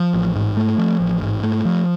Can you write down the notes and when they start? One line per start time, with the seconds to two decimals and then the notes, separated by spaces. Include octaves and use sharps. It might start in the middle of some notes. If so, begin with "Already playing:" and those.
Already playing: F3
0.14 A1
0.35 G#2
0.57 A3
0.78 F3
1.00 A1
1.22 G#2
1.43 A3
1.65 F3